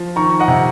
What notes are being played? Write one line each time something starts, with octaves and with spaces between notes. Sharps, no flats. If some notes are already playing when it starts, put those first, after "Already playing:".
Already playing: F3
D#3 A#5 C#6
D#5 F#5
C3